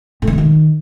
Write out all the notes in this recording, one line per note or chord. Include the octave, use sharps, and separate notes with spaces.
A2
D#3
B2
D#3